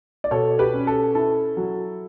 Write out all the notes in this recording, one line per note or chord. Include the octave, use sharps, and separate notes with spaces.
D5
B2 A4 C#5
G4 B4
C#4
A4
E4 A4
F#3